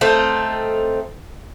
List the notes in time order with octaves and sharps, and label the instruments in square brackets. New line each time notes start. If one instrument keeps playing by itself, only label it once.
[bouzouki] A3 C4 D#4 F4